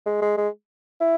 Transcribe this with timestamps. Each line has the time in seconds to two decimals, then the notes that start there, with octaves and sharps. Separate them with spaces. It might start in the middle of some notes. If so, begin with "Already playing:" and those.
0.06 G#3
0.22 G#3
0.38 G#3
1.00 E4